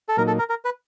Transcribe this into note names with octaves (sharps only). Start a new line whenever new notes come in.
A4
A#2 F#3 A#3 D#4 A#4
A4
A#4
A#4
B4